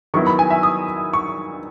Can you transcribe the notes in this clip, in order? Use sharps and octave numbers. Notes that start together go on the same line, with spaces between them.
D#3 F#3 B3 E4 C#6
B5
G#5
E5
D#6
C#6